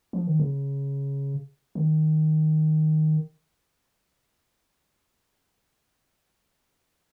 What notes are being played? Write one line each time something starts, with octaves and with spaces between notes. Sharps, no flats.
F3
D#3
C#3
D#3